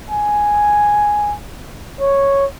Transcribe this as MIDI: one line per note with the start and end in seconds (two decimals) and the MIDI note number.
0.10 1.34 80
2.00 2.45 73